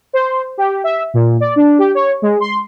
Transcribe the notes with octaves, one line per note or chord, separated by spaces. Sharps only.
C5
G4
E5
A#2
D5
D4
G4
C#5
G#3
C6